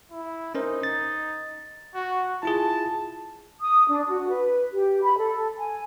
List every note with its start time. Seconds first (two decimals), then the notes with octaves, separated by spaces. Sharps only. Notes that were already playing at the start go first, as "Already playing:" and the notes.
0.11 E4
0.55 C#4 D#4 A#4 C5
0.83 A6
1.95 F#4
2.43 E4 F4 G#4 A5
3.61 D#6
3.88 D4
4.08 F#4
4.29 B4
4.72 G4
5.03 B5
5.18 A4
5.58 G#5